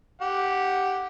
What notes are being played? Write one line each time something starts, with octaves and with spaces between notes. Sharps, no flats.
G4 F#5